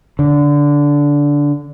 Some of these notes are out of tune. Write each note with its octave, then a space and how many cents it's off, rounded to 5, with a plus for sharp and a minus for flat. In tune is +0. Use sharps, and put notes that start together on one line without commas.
D3 -15